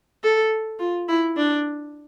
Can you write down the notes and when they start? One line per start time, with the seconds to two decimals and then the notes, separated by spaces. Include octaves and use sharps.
0.24 A4
0.79 F4
1.08 E4
1.37 D4